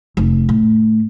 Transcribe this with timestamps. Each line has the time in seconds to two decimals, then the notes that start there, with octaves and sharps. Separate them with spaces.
0.17 F1
0.49 A2